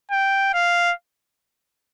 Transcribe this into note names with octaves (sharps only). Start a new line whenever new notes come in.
G5
F5